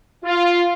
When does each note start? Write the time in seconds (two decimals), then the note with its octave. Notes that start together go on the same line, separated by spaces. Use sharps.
0.24 F4